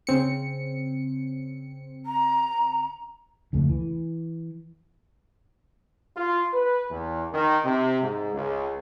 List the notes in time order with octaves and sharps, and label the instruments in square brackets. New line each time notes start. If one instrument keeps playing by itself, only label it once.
[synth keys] C#3 C4 C#7
[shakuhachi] A#5
[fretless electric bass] F1 C#2 A3
E3
[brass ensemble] F4
B4
E2
D#3
C3
G#2
C#2